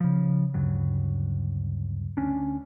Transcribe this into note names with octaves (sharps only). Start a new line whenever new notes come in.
C#3 F3
D2 G2 C#3 F#3
D2 C#4 D4